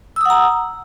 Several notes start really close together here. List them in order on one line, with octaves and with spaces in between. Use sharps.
E6 D#6 F#5 A#5